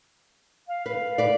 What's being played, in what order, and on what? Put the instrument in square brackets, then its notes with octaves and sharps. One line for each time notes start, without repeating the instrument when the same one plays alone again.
[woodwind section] F5
[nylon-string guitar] B4
B4 D5